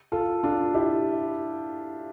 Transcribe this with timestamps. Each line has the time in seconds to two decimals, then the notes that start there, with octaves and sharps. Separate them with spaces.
0.12 F4 A4
0.43 D4 F4
0.74 E4 G4